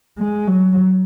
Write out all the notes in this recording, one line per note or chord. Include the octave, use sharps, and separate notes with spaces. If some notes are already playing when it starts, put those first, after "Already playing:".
G#3
F#3